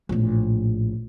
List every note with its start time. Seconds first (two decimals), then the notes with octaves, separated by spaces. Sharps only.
0.09 A#1 A2